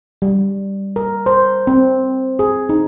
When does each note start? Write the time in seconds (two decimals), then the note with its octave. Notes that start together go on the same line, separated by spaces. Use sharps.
0.22 G3
0.96 A#4
1.26 C5
1.67 C4
2.39 G#4
2.69 D#4